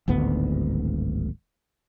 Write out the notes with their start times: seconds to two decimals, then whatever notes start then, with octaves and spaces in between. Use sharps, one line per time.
0.08 D1 G#1 D2 B3